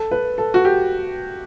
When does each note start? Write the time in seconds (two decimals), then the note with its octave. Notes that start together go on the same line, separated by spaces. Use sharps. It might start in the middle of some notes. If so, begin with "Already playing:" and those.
Already playing: A4
0.11 B4
0.38 A4
0.54 F#4
0.65 G4